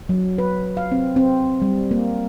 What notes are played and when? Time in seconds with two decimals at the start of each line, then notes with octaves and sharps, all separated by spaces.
0.09 F#3
0.38 B4
0.77 F5
0.92 C4
1.16 C4
1.62 G3
1.91 A#3